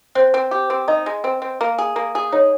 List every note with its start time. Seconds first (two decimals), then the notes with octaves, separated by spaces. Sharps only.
0.15 C4 C5
0.34 C4
0.51 G4
0.70 C4
0.88 D#4 D#5
1.06 G#3
1.24 C4
1.42 C4
1.61 A#3
1.78 G#4
1.96 A#3
2.15 G#4
2.32 D#4 C#5